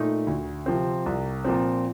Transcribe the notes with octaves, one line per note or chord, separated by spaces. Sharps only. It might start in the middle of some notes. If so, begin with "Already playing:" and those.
Already playing: A#2 A3 D#4
D2
C3 F3 C4
C2
A#2 F3 C4